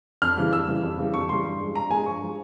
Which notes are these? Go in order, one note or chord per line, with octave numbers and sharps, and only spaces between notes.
F2 F6
C#3 E3 G3
F2 E6
C#3 E3 G3
F2
C#3 E3 G3
F2 C#6
C#3 E3 G3 C6
G2
F3 G#3
G2 A#5
F3 G#3 G#5
G2 C#6
F3 G#3